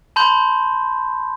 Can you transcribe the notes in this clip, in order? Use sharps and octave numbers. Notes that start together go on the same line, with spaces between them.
A5 B5 C6 G6